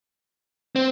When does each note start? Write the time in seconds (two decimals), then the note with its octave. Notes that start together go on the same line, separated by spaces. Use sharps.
0.76 C4